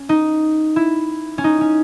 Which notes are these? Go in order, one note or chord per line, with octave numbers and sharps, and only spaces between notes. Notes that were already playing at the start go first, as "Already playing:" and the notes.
Already playing: C#4
D#4
E4
C#4
D#4
C#4